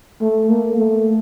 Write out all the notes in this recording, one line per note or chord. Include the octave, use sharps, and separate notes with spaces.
A3
A#3
A3